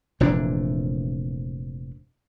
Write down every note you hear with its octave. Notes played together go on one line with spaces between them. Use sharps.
F1 A#2 E3 D4